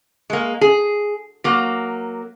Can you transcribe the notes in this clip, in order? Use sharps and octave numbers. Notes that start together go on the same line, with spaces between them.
G#3 A#3
G#4
F#3 A#3